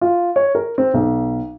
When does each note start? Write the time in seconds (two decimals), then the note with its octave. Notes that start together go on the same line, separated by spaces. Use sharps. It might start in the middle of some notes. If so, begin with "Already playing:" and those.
0.01 F4
0.36 C#5
0.55 A#4
0.78 C4
0.94 B1